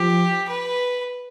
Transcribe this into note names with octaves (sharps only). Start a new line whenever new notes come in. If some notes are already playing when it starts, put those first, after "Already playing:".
Already playing: F3 G4
B4